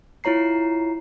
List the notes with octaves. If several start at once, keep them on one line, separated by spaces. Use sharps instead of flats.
E4 F4 C#5 A#5 C7